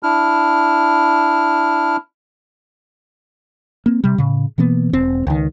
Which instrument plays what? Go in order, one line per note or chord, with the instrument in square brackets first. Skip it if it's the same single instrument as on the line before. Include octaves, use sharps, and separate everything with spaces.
[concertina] D4 E4 F6
[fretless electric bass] A#3 C4
C3 G3
A2 C#3
B2 E3 A#3 B3
E1 C4
C#2 D#3